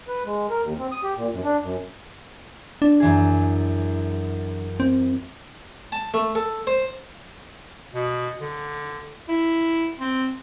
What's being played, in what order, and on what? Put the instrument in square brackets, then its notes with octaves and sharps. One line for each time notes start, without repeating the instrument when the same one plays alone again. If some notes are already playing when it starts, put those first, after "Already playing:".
[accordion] B4
G#3
A#4
D#2
C4
D#6
G4
A#2
F#2
D4
F#2
[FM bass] D4
[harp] F#2 E3 G#4
[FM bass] C4
[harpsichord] A5
A3
A4
C5
[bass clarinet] B2
D3
E4
C4